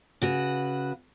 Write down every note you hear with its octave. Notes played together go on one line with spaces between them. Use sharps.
C#3 F#4 B4